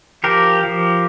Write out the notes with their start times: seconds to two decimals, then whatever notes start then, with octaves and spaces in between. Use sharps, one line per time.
0.24 F3 G4 A#4
0.64 F3